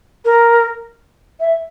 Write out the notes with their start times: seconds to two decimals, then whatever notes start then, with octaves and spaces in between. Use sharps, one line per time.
0.25 A#4
1.40 E5